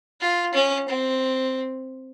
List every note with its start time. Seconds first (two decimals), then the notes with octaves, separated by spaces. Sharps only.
0.21 F4
0.54 C#4
0.88 C4